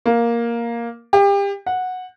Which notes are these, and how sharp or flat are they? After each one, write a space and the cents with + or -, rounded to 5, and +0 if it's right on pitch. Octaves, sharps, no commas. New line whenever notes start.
A#3 +5
G4 +30
F#5 -10